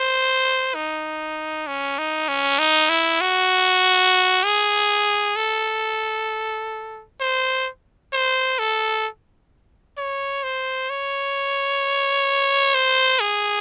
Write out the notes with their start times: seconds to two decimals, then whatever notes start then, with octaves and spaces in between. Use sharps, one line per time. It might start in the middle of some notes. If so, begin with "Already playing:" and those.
Already playing: C5
0.75 D#4
1.67 C#4
1.98 D#4
2.28 C#4
2.59 D#4
2.89 E4
3.21 F#4
4.44 G#4
5.36 A4
7.20 C5
8.13 C5
8.59 A4
9.98 C#5
10.43 C5
10.90 C#5
12.74 C5
13.20 G#4